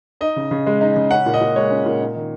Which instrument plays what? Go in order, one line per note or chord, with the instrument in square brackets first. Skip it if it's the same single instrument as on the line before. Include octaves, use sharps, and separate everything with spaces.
[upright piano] D#4 D#5
C#3
C#3
G#3
D#4
C#3
C#4 F#5
A#2
D#5
A#2
G#3 C#5
C#4
A#2
D#4
D#3